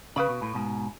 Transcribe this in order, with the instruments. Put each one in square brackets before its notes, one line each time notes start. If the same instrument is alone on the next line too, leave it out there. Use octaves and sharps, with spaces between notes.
[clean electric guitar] C#3 [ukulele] B4 F5 B5
[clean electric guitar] B2
A2
G#2 B2